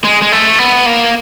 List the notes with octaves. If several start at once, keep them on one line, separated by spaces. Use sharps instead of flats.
G#3
G#3
A3
B3
A#3